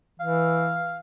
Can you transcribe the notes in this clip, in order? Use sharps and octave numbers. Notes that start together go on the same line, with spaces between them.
E3 F5